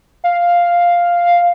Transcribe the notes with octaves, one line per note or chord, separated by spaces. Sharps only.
F5